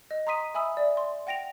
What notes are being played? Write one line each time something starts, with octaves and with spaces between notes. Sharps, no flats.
D#5
A#5 C6 D#6 B6 D#7
E5 G#5 B5 D#6 E6
D5 E5
C6
F#5 G5 A#6 D7 F7